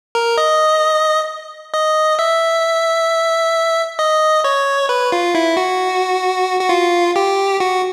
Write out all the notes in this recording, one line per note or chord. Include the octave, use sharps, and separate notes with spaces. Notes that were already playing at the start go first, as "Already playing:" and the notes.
A#4
D#5
D#5
E5
D#5
C#5
B4
F4
E4
F#4
F#4
F4
G4
F#4